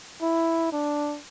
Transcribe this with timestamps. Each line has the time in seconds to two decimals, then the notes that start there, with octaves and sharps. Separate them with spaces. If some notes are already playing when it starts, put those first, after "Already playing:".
0.22 E4
0.72 D4